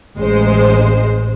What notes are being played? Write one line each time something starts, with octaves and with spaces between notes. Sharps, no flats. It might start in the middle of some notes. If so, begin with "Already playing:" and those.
A1 G#3 C5